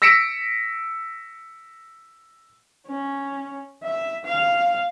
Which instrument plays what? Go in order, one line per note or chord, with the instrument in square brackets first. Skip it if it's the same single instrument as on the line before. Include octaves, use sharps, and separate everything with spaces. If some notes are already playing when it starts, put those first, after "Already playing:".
[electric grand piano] E6 A#6 B6 C#7 D7 E7
[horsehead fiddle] C#4
E5
F5